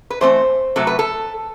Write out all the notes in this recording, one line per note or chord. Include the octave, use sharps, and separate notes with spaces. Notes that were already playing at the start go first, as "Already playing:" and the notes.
B4
E3 A3 C4 C5
C3 F#3 A3 A4
B4
A4